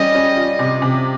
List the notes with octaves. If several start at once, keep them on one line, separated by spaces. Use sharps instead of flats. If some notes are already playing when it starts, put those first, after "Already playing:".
Already playing: G3 C#4 D#5
C#4
F4
C3
C3